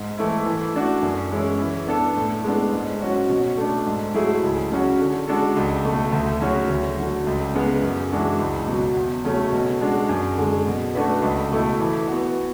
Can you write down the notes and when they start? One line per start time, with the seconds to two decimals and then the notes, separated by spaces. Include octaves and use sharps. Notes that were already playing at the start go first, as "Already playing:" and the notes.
Already playing: G#2
0.17 E3 A3 E4
0.46 E3
0.74 A3 D4 F#4
1.03 F#2
1.31 E3 G#3 C#4 E4
1.59 E3
1.87 B3 D4 A4
2.16 A2
2.44 G#3 B3 D4
2.72 G#2
3.02 F#3 C#4 F#4
3.29 B2
3.57 A3 D4
3.86 G#2
4.14 F#3 A3 E4 G#4
4.43 C#2
4.71 C#3 F#3 C#4 F#4
5.00 D3
5.28 G#3 D4 F#4 A4
5.56 C#2
5.85 B2 A3
6.12 D2
6.41 C#3 F#3 C#4 F#4
6.69 D2
6.98 D3 F#3
7.27 C#2
7.55 C#3 G#3 B3
7.82 F#2
8.11 E3 G#3 D4 F#4
8.39 C#2
8.67 B2 F#3
8.97 E2
9.25 C#3 F#3 A3 C#4
9.52 B2
9.81 G#3 D4 F#4
10.09 F#2
10.38 D3 G#3
10.67 B2
10.95 A3 D4 F#4 B4
11.22 C#2
11.51 B2 A3 E4 A4
11.80 E3
12.07 B3 F#4